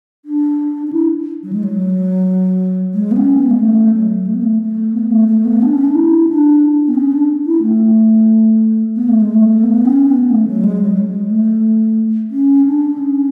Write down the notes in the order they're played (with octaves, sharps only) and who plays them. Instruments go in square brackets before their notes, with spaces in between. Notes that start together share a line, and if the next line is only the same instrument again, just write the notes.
[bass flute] D4
D4
E4
F#3
G#3
F#3
G#3
B3
C#4
B3
G#3
A3
F#3
A3
B3
A3
A3
B3
A3
A3
B3
D4
C#4
D4
E4
D4
B3
C#4
D4
E4
A3
B3
A3
G#3
A3
B3
C#4
B3
A3
F#3
G#3
F#3
G#3
A3
C#4
D4
C#4